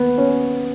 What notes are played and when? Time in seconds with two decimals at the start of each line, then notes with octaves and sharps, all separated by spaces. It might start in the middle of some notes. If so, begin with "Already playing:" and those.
Already playing: D#2 B3
0.18 C#4